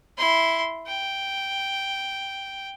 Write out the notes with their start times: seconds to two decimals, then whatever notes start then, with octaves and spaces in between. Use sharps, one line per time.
0.18 E4 C6
0.87 G5